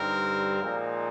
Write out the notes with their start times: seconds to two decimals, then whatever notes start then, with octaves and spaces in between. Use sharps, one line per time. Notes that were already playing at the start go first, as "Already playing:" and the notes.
Already playing: G2 D3 G3 C4 D#4 A#4
0.61 A#2 F3 G#3 C4 D#4